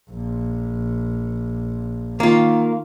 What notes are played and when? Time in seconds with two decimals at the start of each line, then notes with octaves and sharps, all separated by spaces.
0.10 A#1
2.20 D#3 A#3 F4